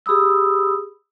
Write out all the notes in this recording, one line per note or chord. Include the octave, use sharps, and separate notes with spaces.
G4 G#4 B5 D#6 E6